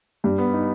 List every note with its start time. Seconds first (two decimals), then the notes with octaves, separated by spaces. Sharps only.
0.24 G2 G3
0.38 B3
0.54 D#4